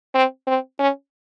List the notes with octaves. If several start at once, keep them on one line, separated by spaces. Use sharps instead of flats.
C4
C4
C#4